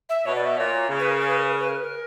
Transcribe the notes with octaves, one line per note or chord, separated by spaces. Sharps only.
E5
B2 C#5
D5
E5
A#2 C#5
C#3
B4
A#4
A#4
B4
A#4
B4
A#4
B4
A#4
B4
A#4